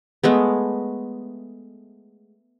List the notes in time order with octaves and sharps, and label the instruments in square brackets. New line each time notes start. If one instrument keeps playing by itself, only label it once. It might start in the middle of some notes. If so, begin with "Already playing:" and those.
[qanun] G#3 A3 B3